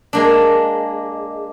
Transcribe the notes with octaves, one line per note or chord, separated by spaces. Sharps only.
G#3 A#3 D4